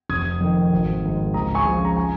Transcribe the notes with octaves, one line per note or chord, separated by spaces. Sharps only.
F1 D#6 G#6
F2 D#3
G#1
G#2 D#3
C#2 A#5 D#6
G#5 C#6
C#3 F3
A#5
G#5